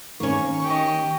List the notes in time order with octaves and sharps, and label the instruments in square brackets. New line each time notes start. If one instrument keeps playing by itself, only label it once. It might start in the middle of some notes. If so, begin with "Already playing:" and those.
[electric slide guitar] D#3 [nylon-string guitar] A#3 C#4 [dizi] C#6
[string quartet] G4 D#5